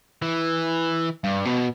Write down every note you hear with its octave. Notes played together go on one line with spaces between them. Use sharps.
E3
G2
B2